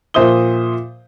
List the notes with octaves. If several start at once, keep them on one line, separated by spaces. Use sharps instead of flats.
A#2 F3 C5 E5 D#6 G7